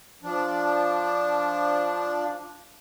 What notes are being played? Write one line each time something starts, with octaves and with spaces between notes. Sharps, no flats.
F3 D4